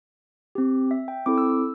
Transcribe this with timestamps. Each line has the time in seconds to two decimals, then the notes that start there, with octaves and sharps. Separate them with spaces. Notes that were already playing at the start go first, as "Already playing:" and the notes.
0.55 C4 G4
0.91 E5
1.08 G5
1.26 C4 E4 A4 D6
1.38 E6
1.50 E6